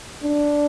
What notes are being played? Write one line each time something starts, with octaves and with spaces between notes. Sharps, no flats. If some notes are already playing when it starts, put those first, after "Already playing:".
D4